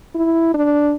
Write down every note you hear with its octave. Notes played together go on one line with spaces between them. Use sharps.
E4
D4